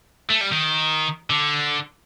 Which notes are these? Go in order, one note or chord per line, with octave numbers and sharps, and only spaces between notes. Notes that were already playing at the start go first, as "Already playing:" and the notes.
A3
G3
D#3
D3